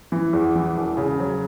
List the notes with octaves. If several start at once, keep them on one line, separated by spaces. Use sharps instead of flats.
E3
E2
E3
E1
C#3
F#3